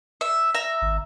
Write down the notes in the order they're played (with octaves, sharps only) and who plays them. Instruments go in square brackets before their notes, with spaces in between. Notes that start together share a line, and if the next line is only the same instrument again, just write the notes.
[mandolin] E5
E5 A#5
[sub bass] G#1